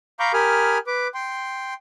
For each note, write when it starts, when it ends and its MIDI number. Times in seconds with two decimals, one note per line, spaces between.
0.20 0.32 77
0.20 0.32 82
0.20 0.32 83
0.20 0.32 85
0.20 0.32 86
0.20 0.32 91
0.34 0.78 67
0.34 0.78 70
0.34 0.78 80
0.34 0.78 83
0.34 0.78 87
0.34 0.78 89
0.87 1.08 71
0.87 1.08 86
1.14 1.74 79
1.14 1.74 84